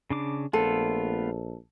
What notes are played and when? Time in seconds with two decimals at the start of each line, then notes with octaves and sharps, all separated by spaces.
0.10 C#3 D4 D6
0.53 A#1 A3 B3 F4 A4